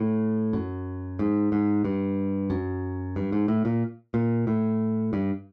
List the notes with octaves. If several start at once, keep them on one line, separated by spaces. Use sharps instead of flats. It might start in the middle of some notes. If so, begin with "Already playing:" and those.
Already playing: A2
F#2
G#2
G#2
G2
F#2
G2
G#2
A2
A#2
A#2
A2
G2